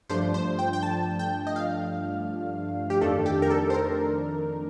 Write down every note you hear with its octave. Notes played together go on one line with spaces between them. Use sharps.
G2 F3 A3 D4 C5
C5
G5
G5
A5
G5
D#5
F5
G4
F2 D#3 A3 D4 A4
G4
A#4
A4
C5
A#4